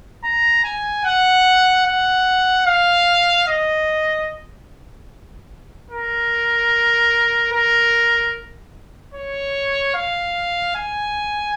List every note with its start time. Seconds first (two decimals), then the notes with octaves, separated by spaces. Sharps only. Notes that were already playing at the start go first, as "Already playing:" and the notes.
0.24 A#5
0.64 G#5
1.05 F#5
1.86 F#5
2.67 F5
3.48 D#5
5.90 A#4
7.52 A#4
9.14 C#5
9.95 F5
10.76 G#5